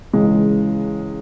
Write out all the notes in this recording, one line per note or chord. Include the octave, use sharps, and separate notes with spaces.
C#2 C#3 E3 G#3